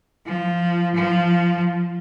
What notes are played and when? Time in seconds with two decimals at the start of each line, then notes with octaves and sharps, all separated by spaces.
0.24 F3
0.94 F3